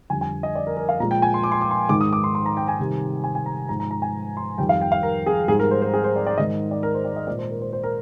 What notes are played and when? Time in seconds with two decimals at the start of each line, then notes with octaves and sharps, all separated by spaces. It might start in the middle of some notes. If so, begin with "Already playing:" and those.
0.10 F2 D3 G3 G#5
0.21 G#5
0.43 D#5
0.55 D5
0.67 A#4
0.77 A#4
0.89 F5
1.00 A#2 F3 G#3 A#5
1.11 G5
1.22 G#5
1.34 C6
1.44 D6
1.52 C6
1.61 D6
1.71 C6
1.89 G#2 D#3 G#3 D6
2.01 D#6
2.13 D6
2.24 C6
2.35 C6
2.46 A#5
2.57 G5
2.68 G#5
2.80 C3 D#3 G3
3.24 G#5
3.35 G#5
3.46 A#5
3.69 G#2 F3 G#3 A#5
3.80 A#5
3.91 A#5
4.02 G#5
4.37 C6
4.58 F2 D#3 G3 G5
4.69 F5
4.81 G5
4.92 F5
5.03 A#4
5.26 G#4
5.48 G#2 G3 G#4
5.59 A#4
5.71 C5
5.82 C5
5.93 G#4
6.04 C5
6.16 D5
6.27 D5
6.38 G#2 D#3 G#3 D#5
6.71 D5
6.83 A#4
6.94 C5
7.05 D5
7.16 D#5
7.27 A#2 G#3 D5
7.39 C5
7.51 A#4
7.61 C5
7.73 C5
7.83 A#4